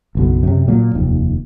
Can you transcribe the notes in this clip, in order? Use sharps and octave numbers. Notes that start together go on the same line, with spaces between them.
F#1 B1 B2
F#2 C3
A#2 F#3
F1 D#2